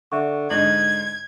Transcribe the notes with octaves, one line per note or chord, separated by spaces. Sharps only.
D3 E5 F#5 C#6
G#2 D3 D#4 G#6 F#7